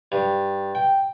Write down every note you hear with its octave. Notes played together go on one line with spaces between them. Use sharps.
G2
G5